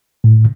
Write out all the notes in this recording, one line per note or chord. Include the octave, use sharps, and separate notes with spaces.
A2